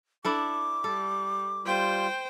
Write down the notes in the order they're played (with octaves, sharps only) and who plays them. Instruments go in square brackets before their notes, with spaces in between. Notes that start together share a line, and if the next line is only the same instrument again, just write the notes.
[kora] D4 E4 A4 [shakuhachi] D6
[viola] G3 [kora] A4
[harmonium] G3 F4 [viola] C5 G5